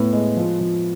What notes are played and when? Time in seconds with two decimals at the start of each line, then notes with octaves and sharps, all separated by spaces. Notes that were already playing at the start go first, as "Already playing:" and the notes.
Already playing: A2 B3
0.13 G#3
0.37 F3
0.61 F3